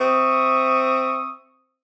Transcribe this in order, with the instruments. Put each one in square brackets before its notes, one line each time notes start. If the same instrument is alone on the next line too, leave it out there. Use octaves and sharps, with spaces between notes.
[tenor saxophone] C4 [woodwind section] E5 C#6 D#6